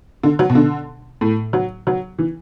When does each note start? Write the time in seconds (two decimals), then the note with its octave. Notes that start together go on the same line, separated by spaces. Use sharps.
0.24 D3
0.39 F#3
0.50 B2
0.55 D3
1.21 A2
1.53 F#3
1.87 F#3
2.19 E3